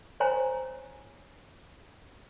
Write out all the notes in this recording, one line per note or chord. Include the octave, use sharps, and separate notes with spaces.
C5 C#5 G#5 A#5